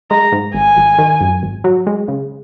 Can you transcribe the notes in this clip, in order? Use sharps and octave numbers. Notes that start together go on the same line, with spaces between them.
G#3 A#5
G#2
G#1 G#5
G#1
D#3
F#2
G#1
F#3
G#3
C#3